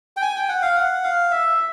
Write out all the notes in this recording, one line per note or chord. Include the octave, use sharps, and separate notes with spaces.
G5
G#5
G5
F#5
F5
F#5
F5
E5